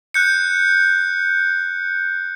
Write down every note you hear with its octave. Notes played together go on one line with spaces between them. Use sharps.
F#6 G6 C#7